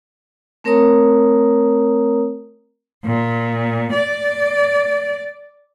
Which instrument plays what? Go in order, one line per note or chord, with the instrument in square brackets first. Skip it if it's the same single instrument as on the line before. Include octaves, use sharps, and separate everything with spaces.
[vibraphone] A3 C4 A#4 C#5 A#5 D#6
[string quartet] A#2
D5